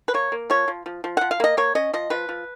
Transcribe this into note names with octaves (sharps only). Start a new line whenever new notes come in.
B4
A#3 C#5
A#3
F3 C#5
F3
F3
F3
F3 F#5
F5
A#3 D#5
A#3 C#5
C#4 D#5
F3 D#5
F3 B4
F3